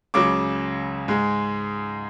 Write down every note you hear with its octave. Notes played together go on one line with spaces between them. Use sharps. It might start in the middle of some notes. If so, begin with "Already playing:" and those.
C#2 C#3 F#3 D6
G#2 G#3